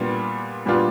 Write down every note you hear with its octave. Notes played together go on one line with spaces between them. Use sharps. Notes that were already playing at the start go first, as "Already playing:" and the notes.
Already playing: A#2 G3 B3 D4 F4
A#2 G3 B3 D4 F4